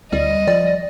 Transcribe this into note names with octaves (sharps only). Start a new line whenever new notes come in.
D2 G3 D#5
F3 D5